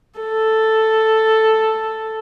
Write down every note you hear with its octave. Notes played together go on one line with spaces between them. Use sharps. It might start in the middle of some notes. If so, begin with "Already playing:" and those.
A4